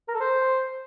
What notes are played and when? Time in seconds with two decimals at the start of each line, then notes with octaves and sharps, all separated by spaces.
0.08 A#4
0.14 A4
0.20 C5